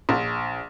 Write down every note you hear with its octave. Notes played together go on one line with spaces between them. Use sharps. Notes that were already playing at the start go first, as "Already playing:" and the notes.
A#1